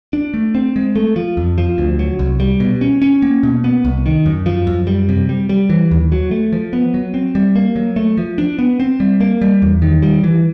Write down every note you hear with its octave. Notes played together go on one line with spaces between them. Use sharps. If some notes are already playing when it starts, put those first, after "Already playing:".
D4
A3
C4
G#3
A3
F3
F2
F3
D2
F#3
C2
G3
B2
C#4
C#4
A#3
B2
B3
C2
D#3
F#2
F3
F#2
G3
C3
G3
G3
E3
D#2
F#3
A3
F3
B3
F#3
C4
G3
A#3
F#3
A3
F3
D4
B3
C4
G3
A#3
G3
E2
D#3
G3
E3